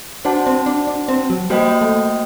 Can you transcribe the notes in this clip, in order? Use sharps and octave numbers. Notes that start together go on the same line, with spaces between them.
D4 F#4 C5 F#5 A5
C4
D4
D4
C4
F#3
G3 A#3 F#4 C5 D#5 G5
A3